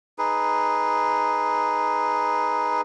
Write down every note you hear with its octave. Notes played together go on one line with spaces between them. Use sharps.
D#4 G#4 B4